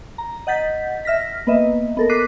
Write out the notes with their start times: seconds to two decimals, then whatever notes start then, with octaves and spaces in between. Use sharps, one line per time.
0.18 A#5
0.47 D#5 F#5 G6 A6 B6
1.05 E5 F6 A#6 B6
1.47 A#3 B3 B4 D#5 E5
1.97 B3 A4 A#4
2.09 D6 F#6 B6 C7 D#7